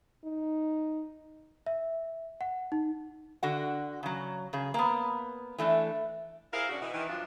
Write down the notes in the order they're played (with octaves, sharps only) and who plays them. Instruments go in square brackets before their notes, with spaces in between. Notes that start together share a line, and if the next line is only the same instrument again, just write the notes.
[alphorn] D#4
[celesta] E5
F#5
D#4
[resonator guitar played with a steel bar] D3 F#4 F#5
C#3 F#3
C#3 G#4
A#3 B3
E3 A3 D4
[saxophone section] E4 G#4 A#4 C5 F5
C#3 D4 F#4
B2 E3
D#3 E3
G2 F3 F#3 D4 F4